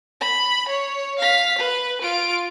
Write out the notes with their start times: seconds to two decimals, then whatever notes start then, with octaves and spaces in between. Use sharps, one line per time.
0.21 B5
0.68 C#5
1.19 F5 B6
1.58 B4
2.02 F4 D7